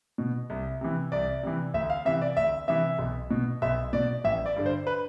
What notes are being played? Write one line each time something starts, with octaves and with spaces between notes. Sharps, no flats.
B2
C2
C3 E3
C2 D5
C3 E3
D2 E5
F5
C3 E3 E5
D5
D2 E5
C3 E3 E5
B1
B2
B1 E5
B2 D5
A1 E5
D5
G2 D3
C5
B4